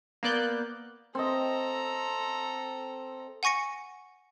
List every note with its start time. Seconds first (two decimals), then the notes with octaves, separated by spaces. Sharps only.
0.23 A#3 B3 D5 F#6 G6
1.15 C4 A4 D#5 A#5
3.43 F#5 G#5 C#6 A#6 C#7